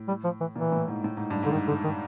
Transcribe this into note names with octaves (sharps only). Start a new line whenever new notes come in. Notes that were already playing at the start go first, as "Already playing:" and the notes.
Already playing: A2
G3
F3
E3
A#2 E3
A2
G#2
A2
G#2
G2
G#2 D3
D#3
D3
D#3